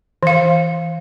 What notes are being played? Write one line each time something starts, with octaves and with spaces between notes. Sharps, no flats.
E3 F5